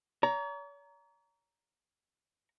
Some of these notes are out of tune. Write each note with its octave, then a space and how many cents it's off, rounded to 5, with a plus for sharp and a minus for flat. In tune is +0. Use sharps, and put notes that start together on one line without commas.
C#5 +45 A#5 +0